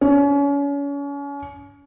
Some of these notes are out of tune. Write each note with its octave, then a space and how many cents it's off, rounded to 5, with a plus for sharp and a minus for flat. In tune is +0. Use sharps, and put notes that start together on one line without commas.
C#4 +35